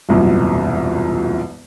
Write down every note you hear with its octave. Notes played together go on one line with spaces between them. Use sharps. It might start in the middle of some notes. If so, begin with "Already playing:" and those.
E1 C2 F#2 A#2